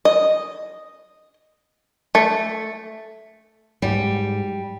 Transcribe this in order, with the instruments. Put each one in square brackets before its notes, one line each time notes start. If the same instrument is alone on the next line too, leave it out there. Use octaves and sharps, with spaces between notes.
[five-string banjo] D#5
A3
[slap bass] G#2 F#3 [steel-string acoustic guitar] G3